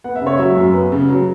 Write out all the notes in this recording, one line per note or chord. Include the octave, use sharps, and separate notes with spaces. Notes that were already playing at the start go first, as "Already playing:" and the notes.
B3 F#5
E5
C#3
C#5
F#3 E5
F#2
B3
C#3
F#3